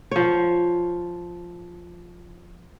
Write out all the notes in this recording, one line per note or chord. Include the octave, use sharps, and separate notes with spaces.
F3 C#5